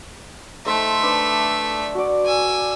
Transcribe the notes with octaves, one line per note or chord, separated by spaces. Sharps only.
A3 D#4 A4 C5 E5
D4 B4 D5
F#4 D5
G#5 E6